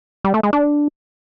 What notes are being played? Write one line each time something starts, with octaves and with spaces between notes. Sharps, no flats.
G3
A3
G#3
D4